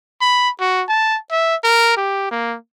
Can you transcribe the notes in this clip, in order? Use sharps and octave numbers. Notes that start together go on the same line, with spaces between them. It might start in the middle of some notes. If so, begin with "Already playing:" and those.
B5
F#4
A5
E5
A#4
G4
A#3